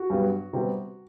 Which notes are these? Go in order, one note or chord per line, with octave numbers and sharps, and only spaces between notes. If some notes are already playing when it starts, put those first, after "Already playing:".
Already playing: F#4
G2 F#3 B3
C3 G3 B3